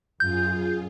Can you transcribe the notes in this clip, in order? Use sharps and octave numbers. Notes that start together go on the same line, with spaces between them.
F#2 F4 G#4 G6